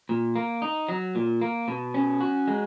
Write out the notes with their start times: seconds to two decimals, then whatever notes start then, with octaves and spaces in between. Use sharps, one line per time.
0.09 A#2
0.36 A#3
0.62 D#4
0.89 F#3
1.15 A#2
1.41 A#3
1.68 B2
1.94 C#4
2.21 F#4
2.48 G#3